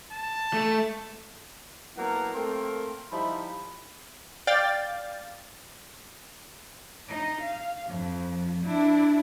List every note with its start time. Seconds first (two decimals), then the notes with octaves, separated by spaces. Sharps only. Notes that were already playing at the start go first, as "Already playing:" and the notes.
0.12 A5
0.54 A3
1.96 F#3 A#3 B3 E4 A4 F#5
2.34 A3 A#3 C4 A#4 G5 C6
3.11 F3 G3 D#4 E4 E5 B5
4.47 D5 F5 G5 A6
7.09 D#4
7.41 F5
7.88 F2 F3
8.65 D4 E4